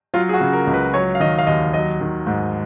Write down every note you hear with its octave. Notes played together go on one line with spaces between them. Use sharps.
F#3 F4
G#4
F#4
C#3
A#4
C#2
B4
F#3 C#5
F5
D#3 D#5
F5
D#2 D#5
F#3 D#5
D#3
G#2